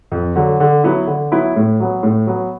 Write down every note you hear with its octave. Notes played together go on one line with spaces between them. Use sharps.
F2
D3 F#3
D3
F#3 B3 E4
D3
F#3 B3 E4
A2
F#3 B3
A2
F#3 B3